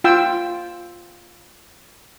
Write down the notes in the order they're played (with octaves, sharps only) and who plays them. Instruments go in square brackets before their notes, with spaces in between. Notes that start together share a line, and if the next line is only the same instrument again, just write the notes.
[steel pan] F4 G5 E6